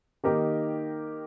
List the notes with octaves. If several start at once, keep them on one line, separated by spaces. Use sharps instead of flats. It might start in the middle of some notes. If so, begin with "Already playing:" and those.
D#3 A#3 D#4 G4 A#4